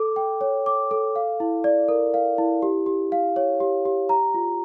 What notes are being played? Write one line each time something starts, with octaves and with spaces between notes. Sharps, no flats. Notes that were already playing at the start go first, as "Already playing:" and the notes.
Already playing: A4 D6
G5
C#5
D6
A4
F5
E4
D5
A#4
F5
E4
G4
G4
F5
C#5
G4
G4
A#5
F4